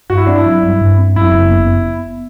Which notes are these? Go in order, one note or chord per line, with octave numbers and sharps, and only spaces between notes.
G2 F#4
E4
C4 D4
E4
F#3
G2
G2
C4
F#2 E4
F#1
B3